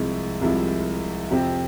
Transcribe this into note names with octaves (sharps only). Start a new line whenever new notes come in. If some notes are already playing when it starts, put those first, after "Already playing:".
Already playing: C2 C3 F3 G#3 E4
C2 C3 F3 G#3 E4
F2 C3 F3 C4 G4